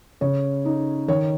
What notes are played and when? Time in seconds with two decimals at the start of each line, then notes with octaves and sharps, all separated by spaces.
0.21 C#3 C#5
0.65 D#4
1.08 D#3 C#5